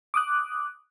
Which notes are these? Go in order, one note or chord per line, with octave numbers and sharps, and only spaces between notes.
D6 D#6 F#6